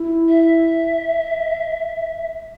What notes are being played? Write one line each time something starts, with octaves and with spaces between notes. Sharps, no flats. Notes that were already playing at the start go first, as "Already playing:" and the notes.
Already playing: E4
E5